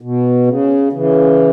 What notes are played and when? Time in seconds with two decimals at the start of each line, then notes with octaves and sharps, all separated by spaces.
0.01 B2
0.47 C#3
0.93 C#3 E3